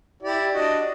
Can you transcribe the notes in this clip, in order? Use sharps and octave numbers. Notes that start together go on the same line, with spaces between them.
E4 G4 D5
D4 F#4 D#5